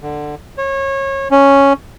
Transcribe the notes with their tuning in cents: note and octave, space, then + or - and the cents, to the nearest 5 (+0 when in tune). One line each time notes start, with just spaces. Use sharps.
D3 +15
C#5 -30
C#4 +0